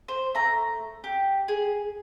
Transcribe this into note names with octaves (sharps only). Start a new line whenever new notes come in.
C5
A3 A#5
G4
G#4